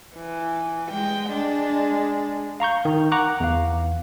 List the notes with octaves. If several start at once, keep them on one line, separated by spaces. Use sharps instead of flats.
E3
G#3 G5
G#3 D4
F5 A#5 C#6 G6
D#3
F#5 A#5 C#6 D6 F#6
E2 F5